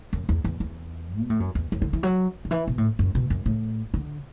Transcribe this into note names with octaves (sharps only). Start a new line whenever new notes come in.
F#2
E2
E2
E2
B2
A2
F#2
E2
F#2
D3
E3
F#3
D3
E3
B2
A2
F#2
B2
F#2
A2
D3